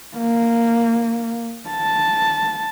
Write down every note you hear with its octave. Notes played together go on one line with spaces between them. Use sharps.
A#3
A5